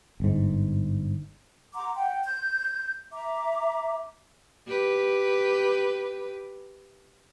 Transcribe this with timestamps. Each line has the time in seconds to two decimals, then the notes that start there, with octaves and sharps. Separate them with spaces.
0.20 G1 G#2
1.74 F#5 A#5 C6 D6
1.95 F#5 G5
2.23 G6
3.12 E5 A#5 D6
4.67 G4 B4